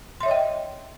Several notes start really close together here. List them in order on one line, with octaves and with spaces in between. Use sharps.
C6 E5 C#5 D#5 G5